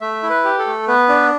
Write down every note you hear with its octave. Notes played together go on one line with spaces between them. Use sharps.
A3 E5
E4
B4
G4
A4
A3
B3 B4
D4